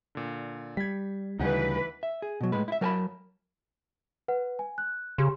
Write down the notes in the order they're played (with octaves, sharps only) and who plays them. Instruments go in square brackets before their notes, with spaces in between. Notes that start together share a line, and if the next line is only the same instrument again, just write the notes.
[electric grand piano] A#2 D3
[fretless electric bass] G3 [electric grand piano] G#6 B6
[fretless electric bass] D2 C#3 G3 [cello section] E3 B4 [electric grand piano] D#4 F#5 G#5
[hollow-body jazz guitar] E5
G#4
B2 F#3
A2 G#3 B4
E4 E5
F#3 A#4 B4 G#5 A5 B5
[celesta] B4 F#5
G#5
F#6
[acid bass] C#3 [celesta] G4 C6